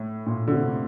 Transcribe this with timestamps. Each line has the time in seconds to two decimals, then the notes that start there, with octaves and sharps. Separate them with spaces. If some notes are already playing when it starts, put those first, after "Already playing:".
Already playing: A2
0.26 A#2
0.48 D3
0.52 C3